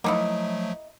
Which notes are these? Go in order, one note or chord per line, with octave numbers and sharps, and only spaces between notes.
F3 F#3 A3 A#3 D#4 E4